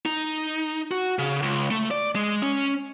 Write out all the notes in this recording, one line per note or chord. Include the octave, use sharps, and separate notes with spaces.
D#4
F#4
C#3
C#2
A3
D5
G#3
C#4